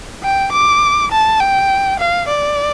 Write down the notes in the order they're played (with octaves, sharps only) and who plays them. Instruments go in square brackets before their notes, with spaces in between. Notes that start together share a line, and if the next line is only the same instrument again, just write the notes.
[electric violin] G5
D6
A5
G5
F5
D5